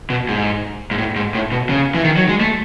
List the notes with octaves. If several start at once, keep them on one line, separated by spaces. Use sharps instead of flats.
B2
G#2
G#2
A2
G#2
A2
B2
C#3
E3
D#3
F#3
G#3
A3